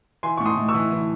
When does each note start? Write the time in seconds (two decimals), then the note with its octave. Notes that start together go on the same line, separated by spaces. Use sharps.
0.23 E3 G#5 C6
0.38 A2 C#6
0.46 C6 D#6
0.57 A2
0.68 C#6 E6
0.74 E3
0.91 E3